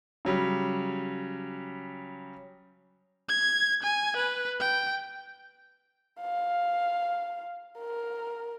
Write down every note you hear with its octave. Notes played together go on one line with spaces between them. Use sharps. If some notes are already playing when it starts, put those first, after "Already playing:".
C#3 F#3 G3
G#6
G#5
B4
G5
F5
A#4